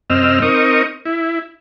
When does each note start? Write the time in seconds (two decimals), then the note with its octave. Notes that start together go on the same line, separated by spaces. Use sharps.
0.10 F#2 C3 C4 D#5 E6 F6
0.42 C4 D#4 A#4 C#6 D#6
1.05 E4